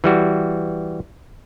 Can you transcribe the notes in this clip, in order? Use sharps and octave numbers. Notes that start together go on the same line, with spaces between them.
E3 G3 F#4